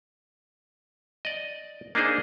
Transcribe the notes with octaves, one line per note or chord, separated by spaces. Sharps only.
D5 D#5
A#3 D4 D#4 G#4 C5